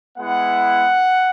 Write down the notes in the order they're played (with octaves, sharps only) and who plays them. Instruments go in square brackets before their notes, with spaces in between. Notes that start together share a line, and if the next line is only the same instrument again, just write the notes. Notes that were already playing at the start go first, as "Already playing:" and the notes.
[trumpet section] G#3 B3 E4 F#5